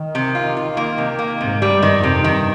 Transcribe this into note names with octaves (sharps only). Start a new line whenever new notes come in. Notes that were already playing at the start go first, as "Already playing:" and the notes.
Already playing: D#3
C3
F4
F4
A#3
C3
A#3
G#2 C3
G3
G2
D#3
F2
C3
G2 D#3